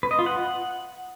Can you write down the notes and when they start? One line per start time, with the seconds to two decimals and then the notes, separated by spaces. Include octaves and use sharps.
0.03 B4
0.11 D#5
0.19 F4
0.26 F#5